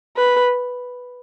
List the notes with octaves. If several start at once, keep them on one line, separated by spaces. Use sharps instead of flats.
B4